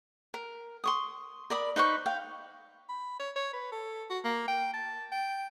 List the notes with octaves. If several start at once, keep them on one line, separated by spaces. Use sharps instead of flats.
A#4
C6 C#6 D#6
A#4 D5 B5 D#6
D#4 B4 C5 C#6
F5 G5
B5
C#5
C#5
B4
A4
F#4
A#3
G5
A5
G5